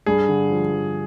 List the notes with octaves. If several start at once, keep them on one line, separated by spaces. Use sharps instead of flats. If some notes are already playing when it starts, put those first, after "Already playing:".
G2 G#4
D3
F3
F3